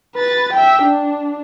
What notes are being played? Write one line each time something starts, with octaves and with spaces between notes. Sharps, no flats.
B4 A6
E5 G5
D4